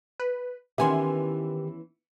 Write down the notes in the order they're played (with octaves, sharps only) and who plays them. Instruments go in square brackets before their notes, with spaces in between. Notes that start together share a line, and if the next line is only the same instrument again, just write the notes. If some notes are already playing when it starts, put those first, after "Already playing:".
[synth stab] B4
[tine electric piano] D#3 G4 [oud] E3 B3 C#4 [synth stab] E5 G#5 C6